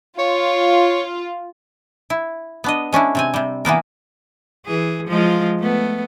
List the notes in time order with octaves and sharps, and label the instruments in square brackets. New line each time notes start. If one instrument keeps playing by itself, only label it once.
[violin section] F4 [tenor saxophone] C#5
[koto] E4
B3 D4 D#5
G#3 C#4 D4 E4
C3 C4 G#5
C3 G3
E3 A#3 B3 A#4
[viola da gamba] E3 G#4
F3 G#3 F4
A3 B3